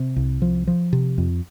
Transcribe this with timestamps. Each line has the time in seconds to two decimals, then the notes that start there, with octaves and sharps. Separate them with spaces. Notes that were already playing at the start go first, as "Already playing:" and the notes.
Already playing: C3
0.16 C2
0.42 F3
0.67 F3
0.93 C3
1.18 F2